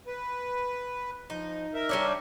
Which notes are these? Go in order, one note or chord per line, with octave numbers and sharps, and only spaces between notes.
B4
F3 D#4
A#4 E5
G3 C#4 D4